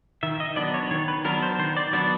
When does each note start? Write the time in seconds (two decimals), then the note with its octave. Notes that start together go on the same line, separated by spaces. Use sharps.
0.23 D#3 E5
0.40 D#5
0.56 F#3 B3 D4 D5
0.74 C#5
0.91 D#3 C#5
1.08 B4
1.25 F#3 B3 D4 A#4
1.43 C5
1.59 D#3 C5
1.77 D5
1.93 F#3 B3 D4 D5